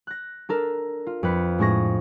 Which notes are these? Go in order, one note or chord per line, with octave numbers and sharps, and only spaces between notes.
F#6 A#6
D4 A4 A#4
F4
F2 B4 C#7
A2 G#3 D4 G#4 C#6 A#6